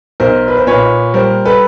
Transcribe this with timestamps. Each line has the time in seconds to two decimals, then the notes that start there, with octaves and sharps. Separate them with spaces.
0.20 B1 A#4 C5
0.48 B4
0.57 C5
0.67 A#2 B4 C#5
1.14 G3 A#4 C5
1.45 A4 B4